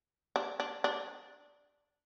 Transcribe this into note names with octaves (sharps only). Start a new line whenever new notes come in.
D4
D4
D4